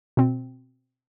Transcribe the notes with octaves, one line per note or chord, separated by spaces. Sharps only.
B2 C4